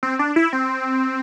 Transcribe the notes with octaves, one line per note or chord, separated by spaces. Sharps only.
C4
D4
E4
C4